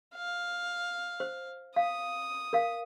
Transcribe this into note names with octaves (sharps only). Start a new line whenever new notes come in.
F5
C5
F5 D#6
A#4 F5